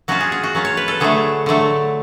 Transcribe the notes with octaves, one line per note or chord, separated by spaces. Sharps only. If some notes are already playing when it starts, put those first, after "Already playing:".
F#3 C#4 F4 F#4
G#4
G#4
F#4
F#3 C#4 F4
C#5
B4
A4
D3 F#3 A3 G#4
D3 F#3 A3